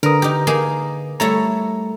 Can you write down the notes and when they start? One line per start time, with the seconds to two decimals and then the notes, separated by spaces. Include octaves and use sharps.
0.03 D3 A#4 B4 D#6
0.22 D#4 G4
0.47 A#3 D#4 G#4
1.20 G3 A3 E4 A4 C#5 A#5